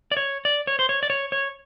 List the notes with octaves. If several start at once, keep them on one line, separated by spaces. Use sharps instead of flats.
D5
C#5
D5
C#5
C5
C#5
D5
C#5
C#5